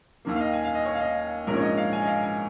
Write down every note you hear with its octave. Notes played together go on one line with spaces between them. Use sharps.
D#2 D#3 A#3
F5
D#5
G#5
F5
D#5
C#5
F5
D#5
A#1 G#2 F3 C#4 A#4
C#5
D#5
F5
G#5
D#5
F5
G#5